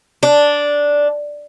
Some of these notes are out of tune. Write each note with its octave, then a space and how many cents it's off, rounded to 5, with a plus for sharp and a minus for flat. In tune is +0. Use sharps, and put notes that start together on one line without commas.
D4 -5